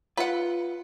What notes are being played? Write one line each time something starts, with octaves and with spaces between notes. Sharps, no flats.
F4 B4 F#5